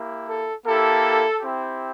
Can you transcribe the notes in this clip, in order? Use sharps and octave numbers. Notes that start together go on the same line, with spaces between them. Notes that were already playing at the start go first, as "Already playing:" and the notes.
Already playing: A#3 E4 G4
A4
A#3 E4 G4 A4
C4 E4 G4